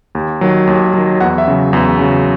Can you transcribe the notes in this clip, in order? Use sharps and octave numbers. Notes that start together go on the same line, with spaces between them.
D#2
D#3 F#3
D#2
D#3 F#3
E2 F#5
E5
C#3 F#3
E2
C#3 F#3